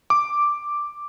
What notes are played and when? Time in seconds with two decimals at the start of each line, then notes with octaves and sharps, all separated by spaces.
0.10 D6